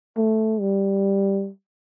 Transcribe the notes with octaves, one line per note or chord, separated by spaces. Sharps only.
A3
G3